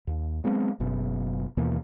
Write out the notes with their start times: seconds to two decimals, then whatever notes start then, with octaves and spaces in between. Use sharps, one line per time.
0.07 D#2
0.44 F#3 G#3 B3 C4
0.80 F#1 F#2 B2
1.57 D#2 B2 E3 A#3